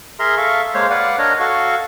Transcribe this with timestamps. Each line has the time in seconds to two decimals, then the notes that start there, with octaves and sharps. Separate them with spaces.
0.19 G#4 A#4 E5 A#5 C6
0.37 A4 E5 F5 C#6
0.74 G#3 A#3 C5 C#5 F5
0.90 B4 D5 F5 F#5
1.18 D4 A#4 C#5 D#5
1.40 F#4 A4 F5 C#6